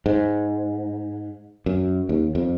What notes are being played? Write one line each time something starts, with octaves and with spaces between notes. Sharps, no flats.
G#2
F#2
D#2
F2